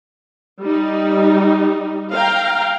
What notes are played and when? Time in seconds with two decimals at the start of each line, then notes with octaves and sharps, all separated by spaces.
0.62 G3 D#4
2.12 F5 G5 A#5